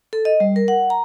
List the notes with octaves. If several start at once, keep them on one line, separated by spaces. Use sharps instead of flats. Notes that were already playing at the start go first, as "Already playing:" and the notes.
A4
D#5
G3
A#4
F#5
A#5